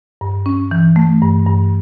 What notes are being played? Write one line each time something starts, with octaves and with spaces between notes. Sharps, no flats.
G2
C#4
E3
A3
G2
G2